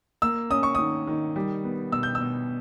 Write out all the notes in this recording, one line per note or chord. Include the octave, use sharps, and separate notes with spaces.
A#3 E6
C#4 D#6
C#6
D#3 D#6
D#3
G3
B3
B2 E6
G6
E6
B2